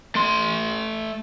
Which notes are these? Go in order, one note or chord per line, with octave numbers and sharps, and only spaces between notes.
A3 C6